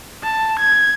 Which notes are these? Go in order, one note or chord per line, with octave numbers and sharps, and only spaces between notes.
A5
G#6